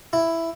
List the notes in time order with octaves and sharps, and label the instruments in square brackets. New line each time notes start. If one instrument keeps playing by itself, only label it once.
[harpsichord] E4